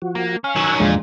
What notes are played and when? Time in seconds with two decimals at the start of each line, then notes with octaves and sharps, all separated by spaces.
0.02 F3 F#4
0.15 A#3
0.44 C#4 F5
0.56 D#3 F#3 E6 F#6 G#6
0.80 E2 A#2 D3 F3 G#3 D4